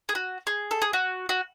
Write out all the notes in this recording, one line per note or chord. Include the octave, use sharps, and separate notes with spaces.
G#4
F#4
G#4
A4
G#4
F#4
F#4